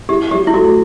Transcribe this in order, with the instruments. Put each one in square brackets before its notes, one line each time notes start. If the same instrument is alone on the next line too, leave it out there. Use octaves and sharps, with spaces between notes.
[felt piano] E4 [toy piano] G4
[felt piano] F#3 [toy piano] G4
[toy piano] E4
[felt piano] A3 [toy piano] F#4